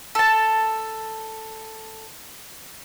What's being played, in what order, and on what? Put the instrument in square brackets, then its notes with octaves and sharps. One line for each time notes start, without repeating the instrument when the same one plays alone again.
[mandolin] A4 A5